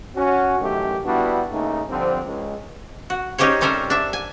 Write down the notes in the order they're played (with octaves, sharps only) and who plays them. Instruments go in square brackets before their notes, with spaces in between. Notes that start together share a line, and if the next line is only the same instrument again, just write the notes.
[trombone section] C#4 F#4
A1 F#2 D#3 A3 G4
G3 B3 D4 E4 F#4
C#3 A3 A#3 D#4
D3 F3 G3 C4
C#2
[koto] F#4
C#4 D#4 G4 C5 C#5
C3 G3 C#4 A4 A#4 C5
D4 E5
G#5